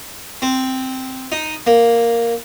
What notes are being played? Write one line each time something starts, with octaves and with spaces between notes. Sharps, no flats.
C4
D#4
A#3